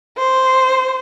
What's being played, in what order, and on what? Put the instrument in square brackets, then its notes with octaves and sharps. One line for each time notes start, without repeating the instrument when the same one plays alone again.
[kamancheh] C5